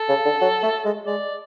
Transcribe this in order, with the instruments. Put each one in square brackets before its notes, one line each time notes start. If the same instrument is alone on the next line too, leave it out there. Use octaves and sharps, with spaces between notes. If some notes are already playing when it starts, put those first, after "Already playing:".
Already playing: [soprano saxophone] A4
[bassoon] C#3
D3
F#3
A3
G#3
[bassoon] G#3 [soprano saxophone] D5